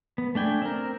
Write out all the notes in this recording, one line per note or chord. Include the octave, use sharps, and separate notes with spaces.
B3
A3 D4 G5 G#5
C4 A#4